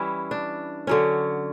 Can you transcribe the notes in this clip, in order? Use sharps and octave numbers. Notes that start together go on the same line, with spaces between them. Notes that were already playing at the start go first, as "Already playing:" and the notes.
Already playing: E3 G3 C#4 E4
D4
D3 F#3 C#4